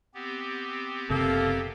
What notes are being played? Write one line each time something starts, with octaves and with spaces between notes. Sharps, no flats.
B3 C4 G4
F#1 C3 A#3 A4